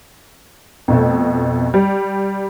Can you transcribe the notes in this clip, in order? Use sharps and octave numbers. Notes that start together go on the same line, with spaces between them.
F2 B2 A3
G3